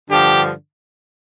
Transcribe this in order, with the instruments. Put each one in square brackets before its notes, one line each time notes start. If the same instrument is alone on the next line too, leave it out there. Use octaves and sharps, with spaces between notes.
[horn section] G2 D3 F3 G4